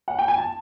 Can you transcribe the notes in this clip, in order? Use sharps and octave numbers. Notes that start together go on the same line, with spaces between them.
F#5
G5
G#5
A5